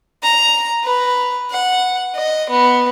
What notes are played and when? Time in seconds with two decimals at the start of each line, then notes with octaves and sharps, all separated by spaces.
0.23 A#5
0.84 B4
1.51 F#5
2.16 D#5
2.50 B3